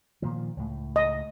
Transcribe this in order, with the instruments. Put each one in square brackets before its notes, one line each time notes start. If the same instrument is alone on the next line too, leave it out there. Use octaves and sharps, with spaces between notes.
[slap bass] A#2 D#3 F3
C#2 A2
[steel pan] D#5